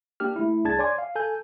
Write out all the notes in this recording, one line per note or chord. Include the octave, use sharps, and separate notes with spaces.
A#3 D4 G4 F6
A3 E4
C2 D4 G#4 A5 G#6 A6
C#5 D5 G#5 C6 D6 G#6
F5
A4 G#5 G6